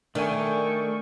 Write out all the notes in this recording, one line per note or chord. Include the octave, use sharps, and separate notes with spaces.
D#3 A3 D4 A4 G5 G#5 C#6